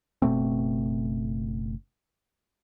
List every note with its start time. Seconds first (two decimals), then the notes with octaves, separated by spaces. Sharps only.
0.22 F#1 B2 A3 C4